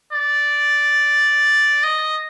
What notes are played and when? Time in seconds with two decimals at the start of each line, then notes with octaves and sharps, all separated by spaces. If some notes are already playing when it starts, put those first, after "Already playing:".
0.13 D5
1.83 D#5